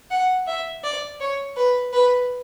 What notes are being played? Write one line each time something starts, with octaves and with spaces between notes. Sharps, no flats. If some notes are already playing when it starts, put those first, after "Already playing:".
F#5
E5
D5
C#5
B4
B4